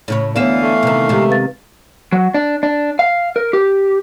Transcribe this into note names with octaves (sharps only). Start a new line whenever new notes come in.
A2 C#3 C#5
D2 D3 E3 B3 C#5 E5 F5
A3
C3 D#3
C3 D#3 G#3 G4
B4 F5 A6
F#3
D4
D4
F5
A#4
G4